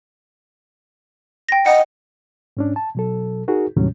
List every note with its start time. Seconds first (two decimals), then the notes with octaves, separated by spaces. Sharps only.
1.49 G5 A#6
1.66 D#5 F#5
2.57 G#2 C#4 D4
2.76 A5
2.95 B2 F#3 A4
3.48 D#4 F#4 G#4 A#4
3.76 D#2 A2 C3 F#3 G3 C#4